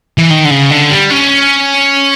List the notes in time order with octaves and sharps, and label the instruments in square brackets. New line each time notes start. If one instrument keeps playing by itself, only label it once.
[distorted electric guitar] E3
D#3
D3
C#3
D3
G3
C#4